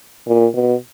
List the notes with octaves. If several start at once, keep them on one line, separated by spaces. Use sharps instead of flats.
A#2
B2